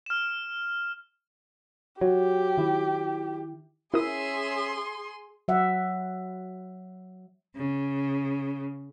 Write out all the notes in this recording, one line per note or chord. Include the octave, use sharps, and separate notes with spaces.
F6 E7
F#3 G4
D#3 E4
C#4 E4 G#4 A#4 E5 C6 D#6
F#3 E5 F#5
C#3